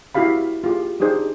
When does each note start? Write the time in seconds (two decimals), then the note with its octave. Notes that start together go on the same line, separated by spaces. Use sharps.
0.15 E4 F#4 G4 F5 B5
0.64 F4 G4 G#4
1.00 D4 D#4 G4 G#4 C5